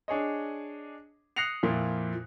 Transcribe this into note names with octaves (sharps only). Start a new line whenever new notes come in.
D4 G#4 C#5 D#5
D#6 F#6 A#6 C7 C#7 F7
F2 A#2 A#3 E4